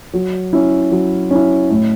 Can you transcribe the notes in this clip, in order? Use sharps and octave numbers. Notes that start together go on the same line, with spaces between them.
F#3
C#4 E4
F#3
C#4 E4
A2